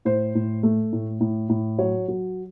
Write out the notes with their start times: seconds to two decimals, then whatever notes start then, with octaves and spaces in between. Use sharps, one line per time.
0.05 A2 C5
0.35 A2
0.63 A3
0.93 A2
1.21 A2
1.49 A2
1.79 F#3 C#5
2.08 F#3